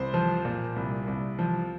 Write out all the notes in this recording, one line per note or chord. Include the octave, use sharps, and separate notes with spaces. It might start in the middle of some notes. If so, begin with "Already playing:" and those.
Already playing: C2 C5
F3
A#2
C2
C2
F3